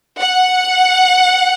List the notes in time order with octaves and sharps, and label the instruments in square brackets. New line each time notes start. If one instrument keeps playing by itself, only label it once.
[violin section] F#5